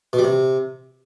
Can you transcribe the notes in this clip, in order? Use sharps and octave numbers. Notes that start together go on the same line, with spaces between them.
B2
G3
C3